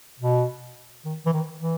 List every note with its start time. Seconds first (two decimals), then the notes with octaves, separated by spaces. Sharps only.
0.19 B2
1.04 D#3
1.26 E3
1.33 D#3
1.60 E3